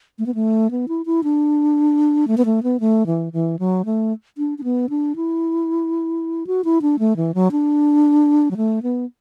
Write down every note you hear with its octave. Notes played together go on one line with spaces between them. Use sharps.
A3
B3
A3
B3
E4
E4
D4
A3
B3
A3
B3
A3
E3
E3
F#3
A3
D4
D4
B3
D4
E4
F#4
E4
D4
A3
E3
F#3
D4
F#3
A3
B3